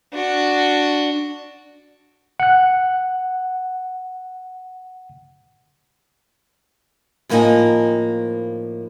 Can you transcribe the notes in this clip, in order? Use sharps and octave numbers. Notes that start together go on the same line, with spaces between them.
D4 F#4
F#5 F#6
A2 F3 A#3 C4 D#4 G#5